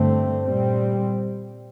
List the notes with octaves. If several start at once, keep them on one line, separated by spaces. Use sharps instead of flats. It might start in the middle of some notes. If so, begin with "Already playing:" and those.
Already playing: G2 D3 A3 C4
A#2 G3 C4